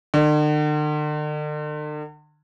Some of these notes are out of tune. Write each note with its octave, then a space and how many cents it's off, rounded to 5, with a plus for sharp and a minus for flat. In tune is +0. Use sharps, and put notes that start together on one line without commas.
D3 +45